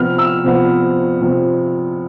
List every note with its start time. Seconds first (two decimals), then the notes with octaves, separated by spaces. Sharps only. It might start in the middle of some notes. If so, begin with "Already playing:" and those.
Already playing: C3 F3 B3 F6
0.18 E6
0.44 C3 F3 B3
1.21 C3 F3 B3